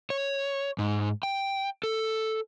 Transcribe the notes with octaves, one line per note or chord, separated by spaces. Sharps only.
C#5
G#2
G5
A4